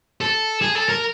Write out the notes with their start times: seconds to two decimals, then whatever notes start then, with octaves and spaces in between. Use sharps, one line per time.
0.21 A4
0.61 G#4
0.75 A4
0.89 A#4